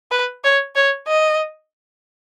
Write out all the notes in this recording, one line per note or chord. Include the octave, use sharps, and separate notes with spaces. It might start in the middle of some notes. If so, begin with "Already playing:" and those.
B4
C#5
C#5
D#5